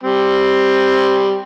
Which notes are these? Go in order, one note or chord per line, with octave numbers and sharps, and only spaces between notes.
G3 C4